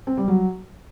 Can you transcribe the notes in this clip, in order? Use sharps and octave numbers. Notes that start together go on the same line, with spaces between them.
C4
G3
F#3